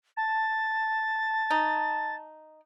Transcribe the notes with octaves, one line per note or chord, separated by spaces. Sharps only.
A5 A6
D#4